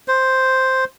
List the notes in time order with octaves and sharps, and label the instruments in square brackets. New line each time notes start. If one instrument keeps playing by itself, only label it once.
[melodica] C5